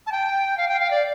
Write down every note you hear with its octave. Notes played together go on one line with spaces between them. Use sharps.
A5
G5
F5
G5
F5
D5